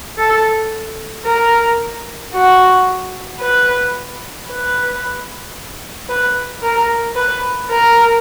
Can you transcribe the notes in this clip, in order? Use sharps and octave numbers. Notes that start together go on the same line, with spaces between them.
A4
A#4
F#4
B4
B4
B4
A#4
B4
A#4